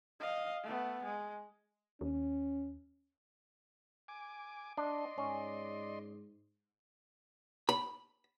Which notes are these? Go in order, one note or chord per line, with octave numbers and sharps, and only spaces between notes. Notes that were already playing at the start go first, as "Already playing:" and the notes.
D#5 F5
A3 B3
G#3
D#2 C#4
G#5 D6
D4 D5 D#5 C6
G#2 C#4
B5